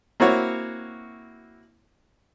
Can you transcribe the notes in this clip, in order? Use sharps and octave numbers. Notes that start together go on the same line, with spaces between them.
A#3 C4 E4 F#4 C#5